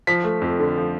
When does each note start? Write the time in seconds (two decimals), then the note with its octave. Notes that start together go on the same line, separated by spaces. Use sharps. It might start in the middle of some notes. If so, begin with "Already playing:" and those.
0.07 F3 B6
0.24 A3
0.41 F2
0.59 D3
0.78 F3